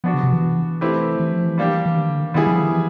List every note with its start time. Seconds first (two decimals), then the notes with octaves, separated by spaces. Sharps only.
0.04 F3 B3 D4 F#4
0.14 C#3
0.23 C3
0.33 E3
0.81 A3 C4 E4 G4 B4
1.20 E3
1.32 F3
1.45 E3
1.58 G3 A#3 D4 G4
1.86 E3
1.97 D#3
2.09 D3
2.21 D#3
2.34 D#3 G3 B3 E4 G#4
2.47 F3
2.60 D#3
2.73 E3